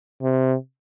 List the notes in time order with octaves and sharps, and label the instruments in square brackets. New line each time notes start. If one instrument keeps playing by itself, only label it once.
[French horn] C3